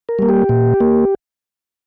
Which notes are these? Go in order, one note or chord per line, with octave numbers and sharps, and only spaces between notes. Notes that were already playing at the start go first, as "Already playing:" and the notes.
A#4
G3 A#3
G4
A#2
A#3